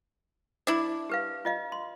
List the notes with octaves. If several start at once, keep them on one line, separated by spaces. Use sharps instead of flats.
D4 E4 D6
G4 B4 F5
F4 D#5 F5
C6